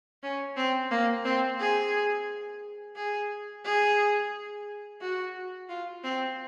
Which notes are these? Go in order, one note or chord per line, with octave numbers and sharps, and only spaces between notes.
C#4
C4
A#3
C4
G#4
G#4
G#4
F#4
F4
C4